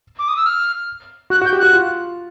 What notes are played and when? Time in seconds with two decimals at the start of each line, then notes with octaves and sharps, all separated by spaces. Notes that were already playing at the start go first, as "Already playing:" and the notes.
0.19 D6
0.28 D#6
0.37 E6
0.46 F6
1.30 F#4 F#6
1.42 F#4
1.45 G6
1.53 G4
1.59 F#4 F#6
1.73 F4